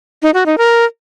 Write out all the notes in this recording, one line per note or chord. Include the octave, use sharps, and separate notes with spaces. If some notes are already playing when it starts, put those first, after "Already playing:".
D#4
F#4
D#4
A#4